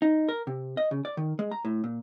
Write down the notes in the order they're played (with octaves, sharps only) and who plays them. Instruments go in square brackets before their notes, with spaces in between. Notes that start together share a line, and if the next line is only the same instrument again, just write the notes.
[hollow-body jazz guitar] D#4
A#4
C3
D#5
C#3
D5
D#3
G#3
A#5
A2
A#2